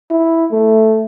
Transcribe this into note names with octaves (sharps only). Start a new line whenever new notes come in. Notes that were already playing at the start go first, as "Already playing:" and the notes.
E4
A3